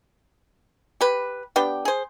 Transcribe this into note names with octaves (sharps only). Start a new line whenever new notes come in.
G4 B4
B3 D4 G4 G5
G#4 C5